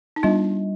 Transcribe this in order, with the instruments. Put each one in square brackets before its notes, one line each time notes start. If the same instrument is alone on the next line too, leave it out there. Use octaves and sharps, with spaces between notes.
[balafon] D#4
[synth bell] G3 [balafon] D4 F4